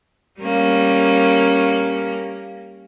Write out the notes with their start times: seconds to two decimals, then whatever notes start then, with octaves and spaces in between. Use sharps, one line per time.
0.40 G3 A#3 C#4